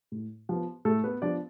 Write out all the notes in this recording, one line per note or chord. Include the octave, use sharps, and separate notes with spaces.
A2
F3 B3
A2 A3 A4
B3 B4
F3 B3 D4 D5